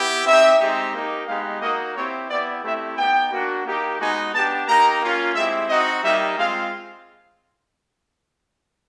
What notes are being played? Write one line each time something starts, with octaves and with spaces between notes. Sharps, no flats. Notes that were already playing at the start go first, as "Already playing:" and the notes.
Already playing: B3 E4 G4
C4 D#4 G4 E5
G#3 C4 D#4 G4
A#3 D#4 G4
G#3 B3 D#4 G4 F5
A#3 D#4 F#4 D#5
C4 E4 G4 C#5
B3 E4 G4 D5
A3 C4 E4 G4 E5
B3 D#4 G4 G5
A#3 D4 F#4
A#3 D#4 G4
G#3 B3 D#4 F#4 G#5
B3 D4 G4 A5
A#3 D#4 G4 A#5
A#3 C#4 F4
G#3 C4 E4 G4 E5
C4 D#4 F#4 D#5
G3 A#3 D#4 G4 E5
G#3 C4 F4 F5